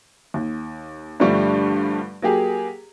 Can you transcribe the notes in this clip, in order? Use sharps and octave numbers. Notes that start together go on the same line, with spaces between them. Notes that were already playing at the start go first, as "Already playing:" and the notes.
D#2
G2 D3 F3 G3 A3 C#6
F#3 A#3 G4 G#4